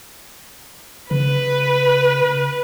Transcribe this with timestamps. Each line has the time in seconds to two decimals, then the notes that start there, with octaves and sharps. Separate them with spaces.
1.11 C#3 B4